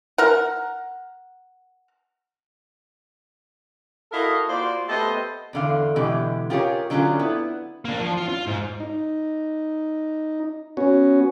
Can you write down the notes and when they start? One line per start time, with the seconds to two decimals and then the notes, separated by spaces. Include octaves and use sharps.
0.18 A#4 F#5
4.12 E4 F#4 A4 A#4 D#5 F5
4.48 A#3 F4 F#4 C5 D5
4.88 A3 B3 G4 A4 C5 D#5
5.53 E2 D3 F5
5.96 B2 D3 E3 G#3 G4
6.50 F4 G4 G#4 A#4 C#5
6.90 D3 F#3 C#4 D#4 F4 G#4
7.19 B3 E4
7.85 A#3 D4
8.00 F3
8.18 F4
8.29 F4
8.47 G#2
8.80 D#4
10.77 B3 C#4 F#4